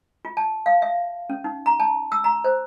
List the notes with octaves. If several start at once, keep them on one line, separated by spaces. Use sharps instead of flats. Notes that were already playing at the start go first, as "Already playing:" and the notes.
F4
A5
F5
E5
C#4
D#4
A#5
A5
E6
A#5
C5